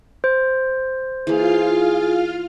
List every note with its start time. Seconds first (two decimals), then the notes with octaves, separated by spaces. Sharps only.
0.24 C5
1.27 E3 A#3 F4 G#4 F5